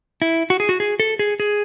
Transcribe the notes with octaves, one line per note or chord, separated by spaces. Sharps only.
E4
F#4
G#4
F#4
G#4
A4
G#4
G#4